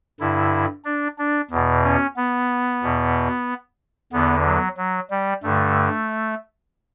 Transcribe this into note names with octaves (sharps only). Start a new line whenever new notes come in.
G2 D3 E4
D4
D4
E2 B2
C#4
B3
E2 B2
E2 D3 B3
F#3
F#3
G3
G2 D3 A3